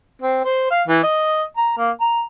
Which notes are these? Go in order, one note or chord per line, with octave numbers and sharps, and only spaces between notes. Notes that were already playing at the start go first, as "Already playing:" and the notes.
C4
C5
F5
E3
D#5
A#5
A#3
A#5